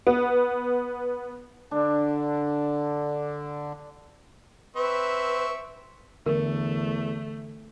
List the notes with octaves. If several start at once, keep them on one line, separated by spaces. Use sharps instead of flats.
B3
D3 D4
C4 B4 E5 C#6
E2 D3 E3 A3 A#4